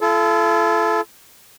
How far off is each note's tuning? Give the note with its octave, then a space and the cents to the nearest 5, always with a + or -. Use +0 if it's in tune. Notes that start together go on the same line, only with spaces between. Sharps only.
F4 -45 A4 -20